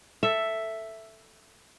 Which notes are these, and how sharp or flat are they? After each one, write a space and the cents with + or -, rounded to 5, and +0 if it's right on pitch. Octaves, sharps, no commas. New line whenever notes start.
A4 +10 E5 +5